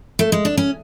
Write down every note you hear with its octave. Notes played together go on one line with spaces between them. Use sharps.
A3
G#3
D4
C#4